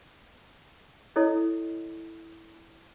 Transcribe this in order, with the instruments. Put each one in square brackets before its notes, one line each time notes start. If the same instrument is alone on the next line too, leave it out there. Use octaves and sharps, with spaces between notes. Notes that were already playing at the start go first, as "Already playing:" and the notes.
[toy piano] E4 A4 C#5 D#5